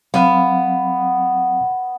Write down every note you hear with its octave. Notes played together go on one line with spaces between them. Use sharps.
F#3 B3 C4 F5